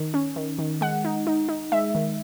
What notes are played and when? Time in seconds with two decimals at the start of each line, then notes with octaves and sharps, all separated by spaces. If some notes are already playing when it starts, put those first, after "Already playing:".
Already playing: D#3
0.14 C#4
0.36 D#3
0.59 D#3
0.81 G#3 F#5
1.05 D#4
1.27 D#4
1.49 D#4
1.72 G#3 E5
1.95 D#3